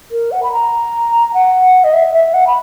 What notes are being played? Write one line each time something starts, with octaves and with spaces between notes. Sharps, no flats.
A#4
F#5
B5
A#5
F#5
D#5
E5
E5
F#5
B5